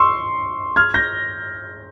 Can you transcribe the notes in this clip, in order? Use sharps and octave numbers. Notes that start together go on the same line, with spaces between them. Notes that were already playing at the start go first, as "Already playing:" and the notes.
Already playing: C6 C#6 E6
F6 G#6
G6 A#6